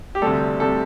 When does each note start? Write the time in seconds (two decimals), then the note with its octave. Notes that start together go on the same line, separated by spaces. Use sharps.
0.15 G4
0.22 D2 C3 G3 A4
0.60 C3 G3 A4